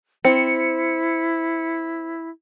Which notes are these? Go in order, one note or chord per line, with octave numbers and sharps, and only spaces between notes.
C4 E4 C#7